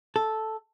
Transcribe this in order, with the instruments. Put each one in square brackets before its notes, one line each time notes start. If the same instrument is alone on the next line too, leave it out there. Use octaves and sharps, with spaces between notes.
[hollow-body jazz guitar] A4